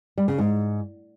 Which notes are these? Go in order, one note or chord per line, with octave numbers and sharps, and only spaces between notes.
G3
C#3
G#2